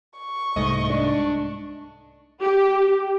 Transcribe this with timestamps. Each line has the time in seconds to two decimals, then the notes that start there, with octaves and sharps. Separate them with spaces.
0.20 C#6
0.56 C2 G#2 A3 D#5
0.90 D4
2.42 G4